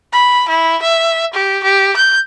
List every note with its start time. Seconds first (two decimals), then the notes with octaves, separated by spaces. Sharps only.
0.13 B5
0.49 E4
0.82 E5
1.34 G4
1.64 G4
1.96 G6